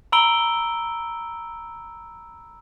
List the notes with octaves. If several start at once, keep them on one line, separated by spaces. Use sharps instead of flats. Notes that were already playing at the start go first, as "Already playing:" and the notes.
A#5 B5 E6 D7 G7